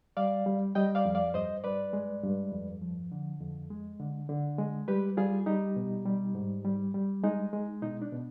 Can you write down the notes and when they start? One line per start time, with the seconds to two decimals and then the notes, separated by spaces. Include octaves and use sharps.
0.17 G3 D5 F5
0.46 G3
0.75 G3 D#5 G5
0.95 D5 F5
1.05 F2
1.15 D5 F5
1.34 G2 C5 D#5
1.64 G2 B4 D5
1.93 G#3
2.23 G2
2.52 F2
2.82 F3
3.12 D3
3.41 F2
3.70 G#3
3.99 D3
4.29 D3
4.58 G#3
4.88 G3 G4 B4
5.17 G3 F4 G#4
5.46 G3 D#4 G4
5.76 B2
6.05 G3
6.35 G#2
6.65 G3
6.94 G3
7.23 G#3 D#4
7.53 G#3
7.82 B2 D#4
8.02 D4
8.12 B2